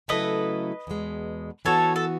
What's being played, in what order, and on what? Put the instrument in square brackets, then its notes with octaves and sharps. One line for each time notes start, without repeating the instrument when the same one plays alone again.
[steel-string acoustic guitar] C#3 F#3 A3 E4 A4 [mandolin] B4 D#5
[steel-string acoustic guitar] E2 B2 G#3
[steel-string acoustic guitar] E3 B3 F#4 [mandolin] A4 C#5
[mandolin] A4